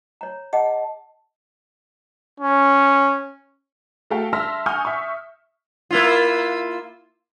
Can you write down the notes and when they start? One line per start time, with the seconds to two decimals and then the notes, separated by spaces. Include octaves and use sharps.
0.21 C#5 A#5
0.53 G#4 D#5 F#5 A5
2.40 C#4
4.10 A3 F#4 A4 F5 G5 A5
4.33 E5 A5 C6 E6 F6 A#6
4.66 F#5 G#5 C#6 D#6 F6 G6
4.85 E5 C#6
5.91 A#3 E4 F4